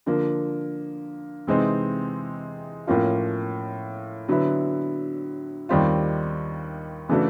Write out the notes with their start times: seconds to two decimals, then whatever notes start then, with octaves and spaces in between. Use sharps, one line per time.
0.06 D3 F3 A#3
1.47 C3 E3 G#3 C4 D#4
2.87 A2 F3 A#3 C#4 F4
4.28 D3 F#3 B3 E4
5.69 D#2 D#3 G3 C4 F4
7.09 C#3 E3 A3 D4 F#4